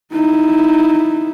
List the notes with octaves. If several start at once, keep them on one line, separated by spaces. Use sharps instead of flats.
D#4 E4